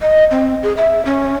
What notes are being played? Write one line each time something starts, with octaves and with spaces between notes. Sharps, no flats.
D#5
C4
G#4
E5
C#4